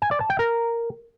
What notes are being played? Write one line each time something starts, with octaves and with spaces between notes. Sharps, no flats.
G#5
D5
A5
G5
A#4